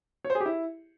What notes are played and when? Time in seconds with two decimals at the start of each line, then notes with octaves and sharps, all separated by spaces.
0.25 C#5
0.30 C5
0.35 G#4
0.40 G4
0.46 E4